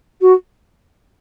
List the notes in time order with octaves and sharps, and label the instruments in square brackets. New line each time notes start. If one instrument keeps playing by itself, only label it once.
[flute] F#4